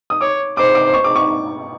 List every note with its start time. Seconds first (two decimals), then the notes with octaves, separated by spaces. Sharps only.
0.10 D#6
0.21 C#5 D6
0.57 C5 D6
0.75 D6
0.94 C#6
1.04 D6
1.16 C#6